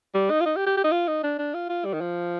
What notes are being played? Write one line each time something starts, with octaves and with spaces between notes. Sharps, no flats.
G3
D#4
F4
D#4
G4
G4
G4
D#4
F4
D#4
D4
D4
F4
F4
G3
D#3
F3